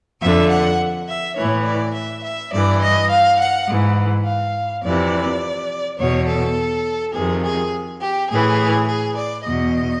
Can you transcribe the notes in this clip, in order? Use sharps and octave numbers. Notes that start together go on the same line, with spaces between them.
F2 D3 E5
F#5
E5
A2 E3 C#5
D5
E5
E5
G2 E3 D5
D#5
F5
F#5
G#2 E3
F5
F2 C3 E3 D5
E2 B2 C#5
A4
F2 C3 D#3 G#4
G#4
G4
A2 E3 G#4
G#4
D5
E2 B2 D#5